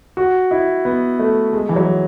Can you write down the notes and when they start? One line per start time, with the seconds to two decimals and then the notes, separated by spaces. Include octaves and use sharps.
0.17 F#4
0.51 E4
0.85 B3
1.19 A3
1.53 G#3
1.69 E3
1.76 F#3